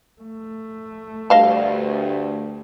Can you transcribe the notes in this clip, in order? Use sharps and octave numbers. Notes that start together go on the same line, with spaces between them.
A3
D2 G2 D#5 F5 A5